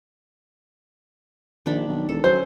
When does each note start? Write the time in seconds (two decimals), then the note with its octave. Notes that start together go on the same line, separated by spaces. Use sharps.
1.66 A#1 D#3 D4 B5
1.88 B1
2.09 E1 A4
2.24 F#3 C#4 C5